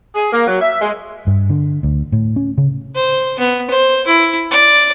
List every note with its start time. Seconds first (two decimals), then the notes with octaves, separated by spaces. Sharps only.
0.15 G#4
0.32 A#3
0.47 F#3
0.60 E5
0.80 G#3
1.27 G2
1.49 D3
1.83 D2
2.12 A2
2.36 C#4
2.58 C#3
2.95 C5
3.39 B3
3.70 C5
4.07 E4
4.51 D5